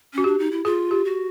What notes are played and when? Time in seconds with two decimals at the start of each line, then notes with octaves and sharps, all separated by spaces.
0.14 C#4 F#4
0.24 D4 G4
0.39 D#4
0.51 E4
0.65 F4 G#4
0.91 G4
1.05 F#4